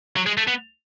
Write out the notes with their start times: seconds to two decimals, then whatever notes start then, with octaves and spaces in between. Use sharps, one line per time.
0.16 F#3
0.26 G#3
0.38 A3
0.48 B3